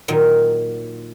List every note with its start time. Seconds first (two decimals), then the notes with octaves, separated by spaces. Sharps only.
0.08 A#2 D#3 F#3